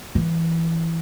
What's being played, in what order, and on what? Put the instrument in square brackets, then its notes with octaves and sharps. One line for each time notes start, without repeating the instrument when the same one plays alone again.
[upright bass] E3